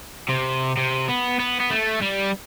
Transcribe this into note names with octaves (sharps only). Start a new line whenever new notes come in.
C3
C3
B3
B3
B3
A3
G3